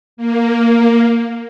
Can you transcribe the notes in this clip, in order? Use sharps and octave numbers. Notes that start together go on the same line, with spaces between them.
A#3